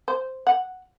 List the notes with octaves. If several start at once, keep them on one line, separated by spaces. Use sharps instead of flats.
C5
F#5